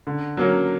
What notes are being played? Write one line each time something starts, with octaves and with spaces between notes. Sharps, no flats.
D3
F#3 A#3 C#4